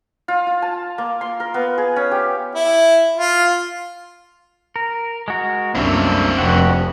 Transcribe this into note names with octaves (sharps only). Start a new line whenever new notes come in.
F4
F4
A5
A#3
C6
A#4
B3
G#4
C#4
G4
E4
F4
A#4
G#3 F#4 A#4
C2 F#2 A3 A#3 C4 D4 E4
F1 F2 F#4 G4 F#5